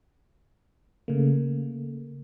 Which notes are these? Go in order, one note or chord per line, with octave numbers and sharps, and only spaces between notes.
C#3 A3 A#3